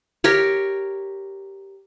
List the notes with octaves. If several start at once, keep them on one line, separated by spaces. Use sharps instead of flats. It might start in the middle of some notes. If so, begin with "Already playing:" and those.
G4 A#4 C#5